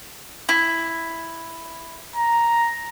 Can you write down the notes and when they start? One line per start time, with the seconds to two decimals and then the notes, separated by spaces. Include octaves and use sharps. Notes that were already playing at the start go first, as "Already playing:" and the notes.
0.49 E4
2.16 A#5